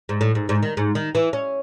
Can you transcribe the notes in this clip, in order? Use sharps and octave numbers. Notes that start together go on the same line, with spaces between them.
G#2
A2
G#2
G#2
D#3
G#2
D#3
E3
C#4